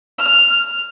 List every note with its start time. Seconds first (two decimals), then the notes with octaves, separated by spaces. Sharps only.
0.18 F6
0.49 F6